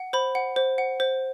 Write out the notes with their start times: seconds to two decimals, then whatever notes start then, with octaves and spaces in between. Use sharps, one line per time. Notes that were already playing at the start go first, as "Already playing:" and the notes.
Already playing: F#5
0.13 C5 B5
0.35 F#5
0.56 C5
0.78 F#5
1.00 C5